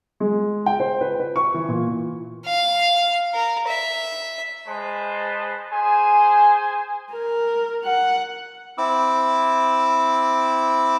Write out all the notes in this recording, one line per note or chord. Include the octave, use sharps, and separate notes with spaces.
G#3
G5
C5
B4
B4
C#6
E3
A#2
F5
A#4
E5
G#3 B4 C5 A5
G#4 C5 G#5
A#4
F#5
C4 E4 D6 E6